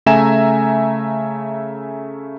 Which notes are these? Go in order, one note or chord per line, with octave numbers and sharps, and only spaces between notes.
C#3 A3 E5 G#5 A#5 E7